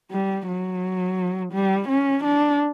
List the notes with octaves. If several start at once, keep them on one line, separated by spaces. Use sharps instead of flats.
G3
F#3
G3
C#4
D4